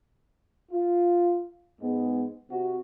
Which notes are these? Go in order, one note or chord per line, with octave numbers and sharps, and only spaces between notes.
F4
G#2 G#3 B3
C3 F#4